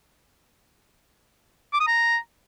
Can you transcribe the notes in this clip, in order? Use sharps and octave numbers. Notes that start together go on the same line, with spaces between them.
D6
D#6
A#5